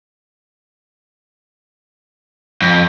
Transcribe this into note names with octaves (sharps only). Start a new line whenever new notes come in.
F2